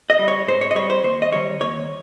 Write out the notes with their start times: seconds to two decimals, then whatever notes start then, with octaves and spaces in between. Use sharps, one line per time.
0.10 D#5
0.19 G3
0.28 C#5
0.48 G#2 C5
0.61 C#5
0.71 D#5
0.75 G3 C#5
0.90 C5
1.03 D#2 C5
1.22 D#5
1.32 D#3 G3 C#5
1.60 D#2 C#5